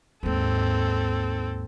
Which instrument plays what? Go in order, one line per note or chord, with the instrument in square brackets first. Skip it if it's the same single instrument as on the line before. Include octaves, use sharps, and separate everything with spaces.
[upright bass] D#2 G#2 [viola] C4 A4